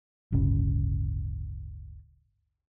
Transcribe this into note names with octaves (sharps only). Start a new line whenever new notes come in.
D1 G1 C#3